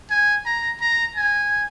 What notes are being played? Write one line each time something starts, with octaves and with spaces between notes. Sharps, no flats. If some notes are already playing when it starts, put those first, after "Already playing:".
G#5
A#5
A#5
G#5